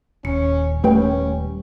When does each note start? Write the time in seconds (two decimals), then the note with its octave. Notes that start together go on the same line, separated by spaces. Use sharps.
0.25 D#1 C#4 C#7
0.84 D#1 G#1 G3 A3 C#4 B4 G5